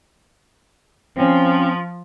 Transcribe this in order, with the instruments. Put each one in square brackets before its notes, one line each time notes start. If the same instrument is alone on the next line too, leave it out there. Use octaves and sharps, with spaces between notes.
[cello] F3 [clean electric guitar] C4 C#4